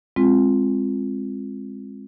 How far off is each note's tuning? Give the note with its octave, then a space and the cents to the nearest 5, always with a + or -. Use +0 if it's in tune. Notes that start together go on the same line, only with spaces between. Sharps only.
G#3 -15 C4 +15 F4 +0